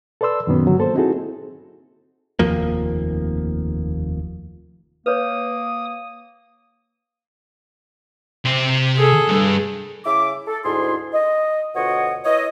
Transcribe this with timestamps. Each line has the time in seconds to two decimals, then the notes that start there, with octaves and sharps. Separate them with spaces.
0.21 A4 B4 D5 C6 E6
0.47 F#2 A#2 D#3 F#3 B3 C#4
0.67 G2 D3 F#3
0.78 A#3 A4 C5
0.95 C4 D#4 E4 F#4 G#4 A4
2.39 F1 D#2 F3 A#3
5.06 A#3 B4 C#5 D#6
8.45 C3 C5
8.97 G#4 A4
9.28 B1 G2
10.05 C#3 E4 E5 D6
10.46 A4
10.63 D2 G#2 E4 G#4 C6
11.13 D#5
11.74 D2 B2 F4 C#5 D#5 F#5
12.25 E4 B4 C#5 D#5